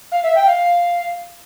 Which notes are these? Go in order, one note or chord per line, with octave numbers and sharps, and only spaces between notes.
F5
E5
G5
F5